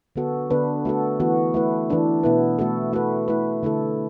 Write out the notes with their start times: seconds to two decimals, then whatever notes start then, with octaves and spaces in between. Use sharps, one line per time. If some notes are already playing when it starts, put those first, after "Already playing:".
0.16 D3 B3 F#4 A4
0.51 D3 B3 D4 B4
0.85 A3 F#4 A4
1.20 E3 B3 F#4
1.54 A3 E4 B4
1.90 E3 D4 A4
2.23 B2 B3 E4 B4
2.59 A3 F#4 A4
2.93 A3 F#4 B4
3.28 A3 E4 B4
3.63 D3 A3 E4 A4